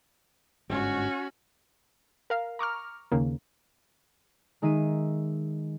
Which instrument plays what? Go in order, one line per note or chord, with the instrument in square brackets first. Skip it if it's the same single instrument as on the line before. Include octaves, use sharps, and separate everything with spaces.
[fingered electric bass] G1 G#2 [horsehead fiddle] C#4 F#4
[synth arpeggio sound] A#4 F5
A#5 C#6 D6 F6
D#2 C#3 A#3
[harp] D#3 G#3 D#4 E5 C7 D#7